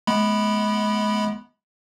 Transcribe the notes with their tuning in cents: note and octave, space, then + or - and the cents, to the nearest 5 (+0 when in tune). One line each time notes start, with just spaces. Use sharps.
G#3 +35 B3 -15 B5 +0